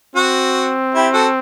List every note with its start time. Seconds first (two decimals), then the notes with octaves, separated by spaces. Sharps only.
0.16 C4 F#4
0.94 E4 G4
1.14 F#4 A4